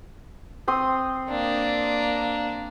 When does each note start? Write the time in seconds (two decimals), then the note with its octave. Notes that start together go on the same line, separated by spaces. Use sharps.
0.68 C4 C6 D#6
1.30 A#3 D4